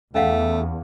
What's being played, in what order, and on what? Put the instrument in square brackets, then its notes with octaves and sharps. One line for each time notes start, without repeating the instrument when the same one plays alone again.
[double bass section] E2 [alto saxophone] A3 [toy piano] C#4 F5 F#5